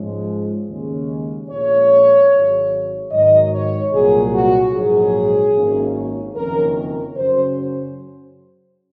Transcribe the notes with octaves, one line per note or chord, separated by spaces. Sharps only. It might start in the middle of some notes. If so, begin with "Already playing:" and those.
Already playing: G#2 F3 G#3 C#4
D#2 C#3 G#3 C#4
A#1 A#2 G#3 C#4 C#5
G#1 G#2 F#3
G#2 D#3 F#3 D#5
C#5
C2 A#2 F#3 G#4
F#4
A#1 G#2 F#3 G#4
G#1 F#2 D#3 A#3 C#4
F#1 F2 D#3 A#3 C#4 A#4
A#4
F#2 C#3 F#3 C#4 C5